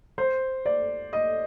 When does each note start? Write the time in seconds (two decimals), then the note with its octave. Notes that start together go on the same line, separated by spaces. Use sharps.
0.18 C5
0.66 D5
1.13 D#5